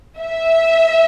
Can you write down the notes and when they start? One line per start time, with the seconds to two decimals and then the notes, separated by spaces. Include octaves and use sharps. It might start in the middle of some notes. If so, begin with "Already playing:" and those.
0.20 E5